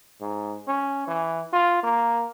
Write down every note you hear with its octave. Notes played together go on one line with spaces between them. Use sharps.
G#2
C#4
E3
F4
A#3